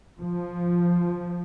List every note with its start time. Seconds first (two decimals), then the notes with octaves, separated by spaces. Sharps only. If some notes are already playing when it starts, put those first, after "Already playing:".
0.19 F3